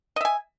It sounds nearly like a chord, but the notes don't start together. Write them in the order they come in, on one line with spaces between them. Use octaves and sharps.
D#5 E5 G#5